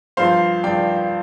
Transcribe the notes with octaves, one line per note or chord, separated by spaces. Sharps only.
G2 F3 C5 F5
G2 F3 D5 G5